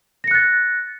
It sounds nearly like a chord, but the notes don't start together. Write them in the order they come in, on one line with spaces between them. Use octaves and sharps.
A#6 C#7 F#6 A6